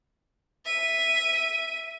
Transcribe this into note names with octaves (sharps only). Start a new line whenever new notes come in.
E5 D#7